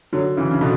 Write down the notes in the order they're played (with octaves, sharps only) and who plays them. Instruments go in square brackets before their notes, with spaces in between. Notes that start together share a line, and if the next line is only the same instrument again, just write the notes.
[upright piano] D3 F#3
C#3 E3
C#3
B2 D3